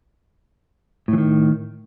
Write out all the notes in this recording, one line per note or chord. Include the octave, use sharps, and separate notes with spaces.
A2 D#3 E3